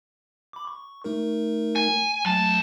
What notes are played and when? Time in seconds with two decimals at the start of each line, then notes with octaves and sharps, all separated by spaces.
0.53 B5 D6
0.67 C#6
1.04 A3 D#4 A#4
1.76 G#5
2.25 B1 F#3 A3 A5